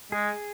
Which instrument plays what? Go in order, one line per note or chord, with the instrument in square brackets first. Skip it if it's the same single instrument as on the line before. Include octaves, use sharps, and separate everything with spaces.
[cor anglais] G#3 [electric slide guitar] G#4